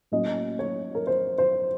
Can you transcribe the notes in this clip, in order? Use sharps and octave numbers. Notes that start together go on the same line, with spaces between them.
A2 F#3 A#3 C#4 D#5
C#5
A#4
C5
C5